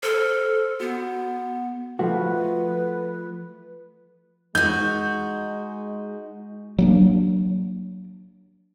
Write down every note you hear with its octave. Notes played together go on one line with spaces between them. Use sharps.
A4 C5 F6
B3 F#4
F3 A3 F#4 B4
G#3 D#4 F#4 G6
F#3 A#3 D4